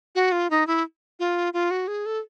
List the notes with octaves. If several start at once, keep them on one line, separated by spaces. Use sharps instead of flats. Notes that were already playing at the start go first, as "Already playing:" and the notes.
F#4
F4
D#4
E4
F4
F4
F#4
G#4
A4